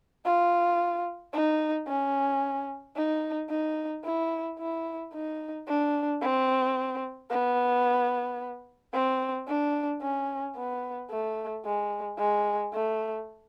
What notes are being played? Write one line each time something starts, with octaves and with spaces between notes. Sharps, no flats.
F4
D#4
C#4
D#4
D#4
E4
E4
D#4
D4
C4
B3
C4
D4
C#4
B3
A3
G#3
G#3
A3